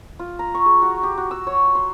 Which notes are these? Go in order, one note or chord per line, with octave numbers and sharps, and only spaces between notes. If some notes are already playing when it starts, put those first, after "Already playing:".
F4
A#5
C#6
G#4
F#4
G4
F#4
E6
C#5
C6